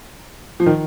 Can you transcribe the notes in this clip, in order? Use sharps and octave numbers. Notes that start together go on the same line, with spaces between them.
F3
D#3